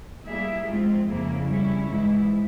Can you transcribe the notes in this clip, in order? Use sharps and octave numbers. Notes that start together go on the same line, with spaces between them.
G3 A#3 E4 G#4 E5
G#2 F3 G#3 C4 F4
F2 C#3 F3 A#3 E4
G3 C#4 E4
G#2 E3 G#3 E4